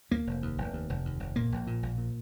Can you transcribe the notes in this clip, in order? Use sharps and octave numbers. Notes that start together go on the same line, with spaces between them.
D#2 A#3
F1
D#2
F1
D#2
F1
D#2
F1
A#2 A#3
A#1
A#2
A#1
A#2